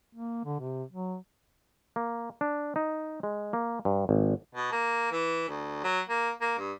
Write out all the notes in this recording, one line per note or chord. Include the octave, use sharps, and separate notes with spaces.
A#3
D3
C3
F#3
A#3
D4
D#4
G#3
A#3
G2
G#1
B2
A#3
E3
D2
F#3
A#3
A#3
G2